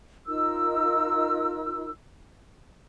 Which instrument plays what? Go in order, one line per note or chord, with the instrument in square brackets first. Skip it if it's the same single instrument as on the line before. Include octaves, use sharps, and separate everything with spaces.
[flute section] D#4 F4 A#4 E6